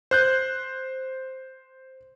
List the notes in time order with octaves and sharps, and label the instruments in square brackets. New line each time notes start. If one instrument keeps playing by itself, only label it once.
[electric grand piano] C5 F#6 G6